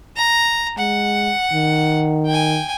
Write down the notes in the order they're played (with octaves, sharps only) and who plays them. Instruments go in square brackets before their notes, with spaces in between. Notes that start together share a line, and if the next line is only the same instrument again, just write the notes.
[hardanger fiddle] A#5
[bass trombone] G#3 [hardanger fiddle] F#5
[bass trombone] D#3
[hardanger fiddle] G5 G#5